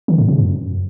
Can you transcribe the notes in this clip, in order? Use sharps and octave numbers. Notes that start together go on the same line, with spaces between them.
D#3
G#2
C3
F#2